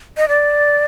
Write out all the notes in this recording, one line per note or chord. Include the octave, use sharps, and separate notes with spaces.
D#5
D5